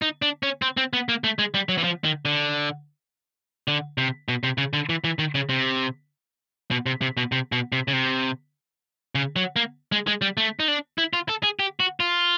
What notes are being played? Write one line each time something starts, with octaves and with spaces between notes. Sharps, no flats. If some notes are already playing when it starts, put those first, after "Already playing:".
D#4
D4
C#4
C4
C4
B3
A#3
A3
G#3
G3
F#3
E3
F3
D#3
D3
D3
C3
B2
C3
C#3
D3
E3
E3
D#3
C#3
C3
B2
C3
C3
B2
C3
B2
C3
C#3
C3
C#3
F#3
A#3
G#3
G#3
G3
A3
D#4
D4
E4
F4
A4
G#4
G4
F#4
F4